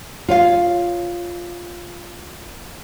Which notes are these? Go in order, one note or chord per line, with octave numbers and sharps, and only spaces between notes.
F4 C#5 F5